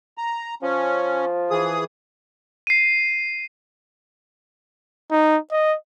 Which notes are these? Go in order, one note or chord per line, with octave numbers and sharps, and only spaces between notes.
A#5
F3 C#4
E3 G#4 D#6
C7 D#7
D#4
D#5